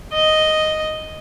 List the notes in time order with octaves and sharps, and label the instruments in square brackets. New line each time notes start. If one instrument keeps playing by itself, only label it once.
[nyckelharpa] D#5